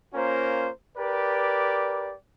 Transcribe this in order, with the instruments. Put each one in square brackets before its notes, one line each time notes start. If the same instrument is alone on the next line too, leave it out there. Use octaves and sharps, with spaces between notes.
[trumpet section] A#3 C#4 F4 A#4 C5
G4 A#4 B4 D5